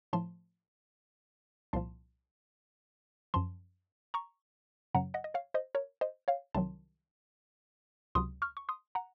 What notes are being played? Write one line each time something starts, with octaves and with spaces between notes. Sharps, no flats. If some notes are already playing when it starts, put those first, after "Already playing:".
A2 F3 A5 C6
C2 A#2 F3 A5 C6
F#2 F3 A5 C6
A#5 C#6
F#2 C#3 F#3 F#5 A#5
D#5 F#5
D#5
C#5 F5
C5 D#5
A#4 C#5
C5 D#5
C#5 F5
C2 C3 D#3 F#3 A5 C6
C#2 C3 F#3 C6 D#6
C#6 F6
C#6
C6 D#6
F#5 A#5